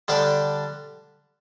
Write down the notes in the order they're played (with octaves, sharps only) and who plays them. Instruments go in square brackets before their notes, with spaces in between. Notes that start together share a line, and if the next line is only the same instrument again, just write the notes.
[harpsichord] D3 G3 D4 G4 D5